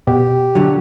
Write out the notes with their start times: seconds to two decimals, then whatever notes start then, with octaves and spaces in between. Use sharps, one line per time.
0.07 B2 G4
0.55 D3 F#3